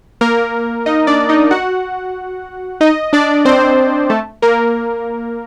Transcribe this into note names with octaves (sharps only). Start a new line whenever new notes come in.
A#3 A#4
D#4 D#5
D4 D5
D#4 D#5
F#4 F#5
D#4 D#5
D4 D5
C4 C5
A3 A4
A#3 A#4